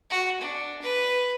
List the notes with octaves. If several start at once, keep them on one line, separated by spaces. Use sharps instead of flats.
F#4
D4
B4